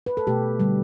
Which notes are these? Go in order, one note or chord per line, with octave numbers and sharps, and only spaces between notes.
B4
A4
B2 A3 G4
D3 G3